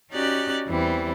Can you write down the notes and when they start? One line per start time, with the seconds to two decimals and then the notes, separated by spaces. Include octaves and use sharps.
0.11 C#4 D#4 F#4 G4 D5 F#6
0.67 E2 E3 G3 C4